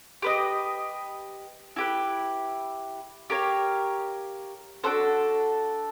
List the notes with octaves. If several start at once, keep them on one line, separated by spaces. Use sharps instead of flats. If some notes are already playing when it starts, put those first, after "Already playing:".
G4 B4 D#5
E4 G4 B4
G4 A#4 C#5 F5
D4 F#4 A4 C5